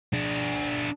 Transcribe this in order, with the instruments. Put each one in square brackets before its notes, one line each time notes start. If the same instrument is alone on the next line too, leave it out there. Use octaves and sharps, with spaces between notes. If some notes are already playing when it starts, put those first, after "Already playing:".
[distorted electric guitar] D4 G#4